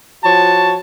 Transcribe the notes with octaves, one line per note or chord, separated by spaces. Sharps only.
F3 F#4 C#5 A5